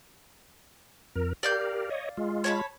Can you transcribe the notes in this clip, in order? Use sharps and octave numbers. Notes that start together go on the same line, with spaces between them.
F2 A#4
G4 A#4 D5 F5 G6
C#5 D#5
G#3 F4
C#5 A5 B5